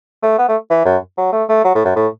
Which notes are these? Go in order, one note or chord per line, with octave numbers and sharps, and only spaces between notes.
A3
B3
A3
E3
F#2
F#3
A3
A3
F#3
A2
F#2
A2